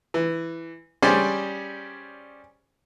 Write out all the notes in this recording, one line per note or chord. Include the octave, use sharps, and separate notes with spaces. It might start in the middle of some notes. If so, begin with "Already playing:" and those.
E3
G3 C#4 G#4 C5 D5